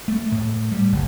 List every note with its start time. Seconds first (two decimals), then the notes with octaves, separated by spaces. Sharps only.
0.08 A3
0.32 A2
0.72 G3
0.92 F#1